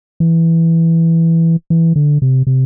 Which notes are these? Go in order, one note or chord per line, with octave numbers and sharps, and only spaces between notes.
E3
E3
D3
C3
C3